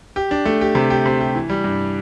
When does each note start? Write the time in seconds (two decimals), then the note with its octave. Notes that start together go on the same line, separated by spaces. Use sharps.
0.16 G4
0.31 D4
0.46 A3
0.61 G4
0.75 C3
0.90 G4
1.06 C3
1.21 G4
1.35 E3
1.50 G3
1.64 G2